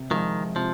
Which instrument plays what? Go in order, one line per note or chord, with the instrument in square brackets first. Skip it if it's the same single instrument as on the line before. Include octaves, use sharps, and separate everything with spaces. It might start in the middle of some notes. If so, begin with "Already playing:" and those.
Already playing: [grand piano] C3
[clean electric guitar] D#3 [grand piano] F3 G#3
[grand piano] C3 [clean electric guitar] F3